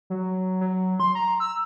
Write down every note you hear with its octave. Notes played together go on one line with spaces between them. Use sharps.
F#3
F#3
C6
A#5
E6